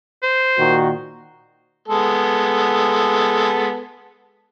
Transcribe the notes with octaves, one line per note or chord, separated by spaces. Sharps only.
C5
A#2 D#3 F#4
G#3 B3 A4